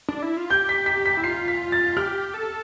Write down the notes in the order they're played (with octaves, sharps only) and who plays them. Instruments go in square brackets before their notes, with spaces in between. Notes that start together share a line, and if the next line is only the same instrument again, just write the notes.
[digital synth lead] D4
E4
F4
[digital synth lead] G4 [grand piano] G6
[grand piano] B6
B6
B6
[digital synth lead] E4
[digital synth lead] F4 [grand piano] C7
[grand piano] B6
A6
[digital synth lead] G4 [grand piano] F6
[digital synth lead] A4